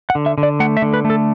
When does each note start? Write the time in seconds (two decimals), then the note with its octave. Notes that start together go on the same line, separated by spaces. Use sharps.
0.10 F#5
0.15 D3
0.26 E5
0.38 D3
0.43 D5
0.60 A3 F#5
0.77 E5
0.82 D3
0.94 B4
1.05 A3
1.10 A4